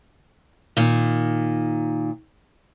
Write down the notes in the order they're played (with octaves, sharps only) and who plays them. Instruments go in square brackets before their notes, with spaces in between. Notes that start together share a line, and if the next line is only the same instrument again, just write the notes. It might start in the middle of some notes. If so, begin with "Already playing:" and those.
[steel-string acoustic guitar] A#2 D#3